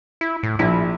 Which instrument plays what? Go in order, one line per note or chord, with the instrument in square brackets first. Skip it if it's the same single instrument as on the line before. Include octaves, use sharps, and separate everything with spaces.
[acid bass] E4
A2
[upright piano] A#1 [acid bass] E4